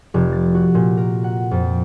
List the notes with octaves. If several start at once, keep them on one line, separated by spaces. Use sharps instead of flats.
F1
A6
F#4
A#2
A#4
F#5
F2